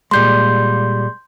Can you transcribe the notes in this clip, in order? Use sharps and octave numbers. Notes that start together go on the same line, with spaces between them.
A#2 G3 G#3 C6 G6